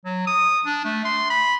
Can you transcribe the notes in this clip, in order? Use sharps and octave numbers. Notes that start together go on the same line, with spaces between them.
F#3
D#6
D4
A3
C6
B5